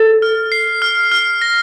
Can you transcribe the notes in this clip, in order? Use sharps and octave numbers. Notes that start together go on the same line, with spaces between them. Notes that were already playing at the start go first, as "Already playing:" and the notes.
Already playing: A4
F6
C7
F6
F6
A#6